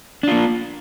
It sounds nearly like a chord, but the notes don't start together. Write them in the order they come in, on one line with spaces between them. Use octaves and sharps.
D4 F4 A#3